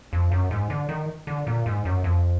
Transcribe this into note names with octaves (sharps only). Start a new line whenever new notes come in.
F2
F#2
G#2
D3
D#3
D3
A#2
G#2
F#2
F2